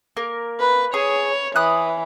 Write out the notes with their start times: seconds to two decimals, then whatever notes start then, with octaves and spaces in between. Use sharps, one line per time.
0.17 A#3 A#4
0.60 B4
0.94 G#4 C#5
1.56 E3 B5 D#6 F#6